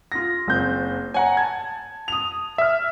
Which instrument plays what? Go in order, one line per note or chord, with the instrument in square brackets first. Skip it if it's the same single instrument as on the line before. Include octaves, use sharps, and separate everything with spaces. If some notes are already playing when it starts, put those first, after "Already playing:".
[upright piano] F4 A#6
F#1 C4 G6
[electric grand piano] C#5 F#5 A#5 [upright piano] G#5
[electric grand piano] A5 G#6
[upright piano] D#6 F7
[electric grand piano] E5 F6